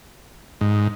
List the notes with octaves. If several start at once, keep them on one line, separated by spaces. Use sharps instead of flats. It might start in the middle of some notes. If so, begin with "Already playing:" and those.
G#2